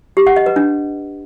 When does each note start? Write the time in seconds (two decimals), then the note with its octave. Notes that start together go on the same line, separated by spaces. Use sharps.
0.17 G4
0.27 F#5
0.36 D#5
0.46 B4
0.56 D4